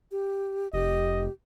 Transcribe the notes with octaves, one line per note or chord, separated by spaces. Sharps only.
G4
F1 G4 D#5